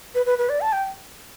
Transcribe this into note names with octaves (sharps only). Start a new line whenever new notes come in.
B4
B4
B4
D5
A5
G5